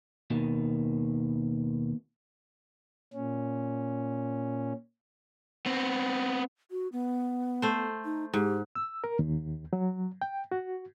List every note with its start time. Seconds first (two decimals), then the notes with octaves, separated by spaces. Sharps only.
0.30 D#2 B2 D#3
3.13 A#2 C#4
5.66 B3 C4
6.71 F#4
6.92 B3
7.62 A3 C5
8.05 D#4
8.34 G#2 G4
8.75 E6
9.04 A#4
9.19 D#2
9.73 F#3
10.22 G5
10.52 F#4